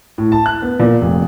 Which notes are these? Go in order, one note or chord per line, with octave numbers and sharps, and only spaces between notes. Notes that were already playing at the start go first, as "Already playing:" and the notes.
A2
A5
F#6
B3
A#2
F1